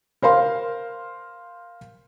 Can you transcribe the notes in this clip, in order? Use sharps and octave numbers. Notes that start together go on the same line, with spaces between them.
A#4 C5 F5 C6